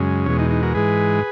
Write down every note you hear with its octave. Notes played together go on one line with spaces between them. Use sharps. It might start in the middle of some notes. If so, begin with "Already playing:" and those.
Already playing: F#2 C#3 G#3
E2 B2 G#3 C#4
D#4
D#4
F#4 A#4
G#2 E3 G#3 G#4 B4